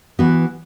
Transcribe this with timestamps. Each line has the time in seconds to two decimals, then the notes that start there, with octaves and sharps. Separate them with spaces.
0.19 E3 B3 F#4